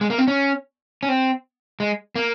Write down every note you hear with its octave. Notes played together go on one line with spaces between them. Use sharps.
G#3
A#3
C4
C#4
C#4
C4
G#3
A#3